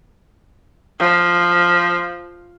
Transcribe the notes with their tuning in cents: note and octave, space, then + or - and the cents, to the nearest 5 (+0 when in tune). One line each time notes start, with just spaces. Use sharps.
F3 +0